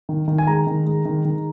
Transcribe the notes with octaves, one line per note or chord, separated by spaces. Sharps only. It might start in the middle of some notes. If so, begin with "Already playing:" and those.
D#3
D#3
G#5
G#3 A#5
D#3
G#3
D#3
D#3